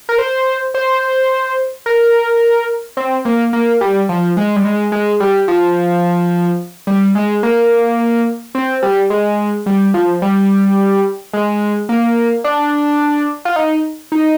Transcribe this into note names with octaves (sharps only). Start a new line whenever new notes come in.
A#4
C5
C5
A#4
C4
A#3
A#3
G3
F3
G#3
G3
G#3
G#3
G3
F3
G3
G#3
A#3
C4
G3
G#3
G3
F3
G3
G#3
A#3
D4
F4
D#4
D#4